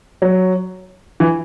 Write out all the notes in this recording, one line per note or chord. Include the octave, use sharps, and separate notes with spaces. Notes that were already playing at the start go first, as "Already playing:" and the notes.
F#3
E3